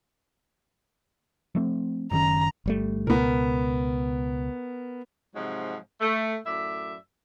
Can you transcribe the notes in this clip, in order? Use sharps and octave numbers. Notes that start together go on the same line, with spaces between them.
F3 A3 C4
F#1 D#3 C#4 A#5
G1 G3 A3
C#2 B2 B3 A#4
G#2 C3 F3 F#3 G#3
A3
F#2 A2 D5 E5